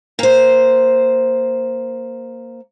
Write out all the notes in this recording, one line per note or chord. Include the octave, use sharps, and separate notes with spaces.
A#3 C5